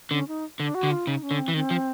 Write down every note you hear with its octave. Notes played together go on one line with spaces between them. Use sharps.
D3 C#4
D#4
D3 D4
F#4
D3
F4
C#3 D#4
C#4
D3
C4
E3
D#3 C4
F3